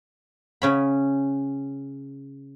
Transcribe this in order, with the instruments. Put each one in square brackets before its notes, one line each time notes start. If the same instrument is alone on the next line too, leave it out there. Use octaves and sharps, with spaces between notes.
[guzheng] C#3 C#4 B5